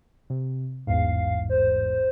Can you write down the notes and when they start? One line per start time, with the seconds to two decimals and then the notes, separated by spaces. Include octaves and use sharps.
0.30 C3
0.87 A1 E2 G#2 F5
1.50 C5